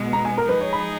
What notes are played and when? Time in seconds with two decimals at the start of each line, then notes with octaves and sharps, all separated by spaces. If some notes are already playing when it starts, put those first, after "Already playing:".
Already playing: B2 G#3 B3
0.13 A#5
0.25 G#5
0.38 A#4
0.49 F3 G#3 D#4 G#4 B4
0.61 C#5
0.73 B5